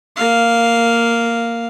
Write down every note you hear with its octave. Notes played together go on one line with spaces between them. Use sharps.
A#3 F5